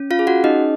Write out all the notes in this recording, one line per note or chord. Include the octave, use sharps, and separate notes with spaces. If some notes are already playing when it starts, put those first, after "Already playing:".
Already playing: C#4
F4 F5
G#4
F#4 F#5
C#4 D#4 D#5